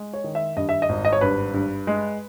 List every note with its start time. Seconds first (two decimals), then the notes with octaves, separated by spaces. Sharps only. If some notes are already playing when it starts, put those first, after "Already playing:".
Already playing: G#3
0.14 C#5
0.24 D#3
0.35 E5
0.57 G2 D#5
0.69 E5
0.82 D#5
0.89 G#1
1.05 D#5
1.13 C#5
1.21 G2 B4
1.54 G2
1.87 G#3